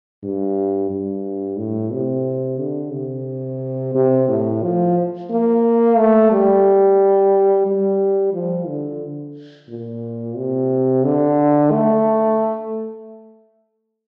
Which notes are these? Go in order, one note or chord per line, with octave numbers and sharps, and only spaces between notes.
G2
G2
A2
C3
D3
C3
C3
A2
F3
A#3
A3
G3
G3
F3
D3
A#2
C3
D3
A3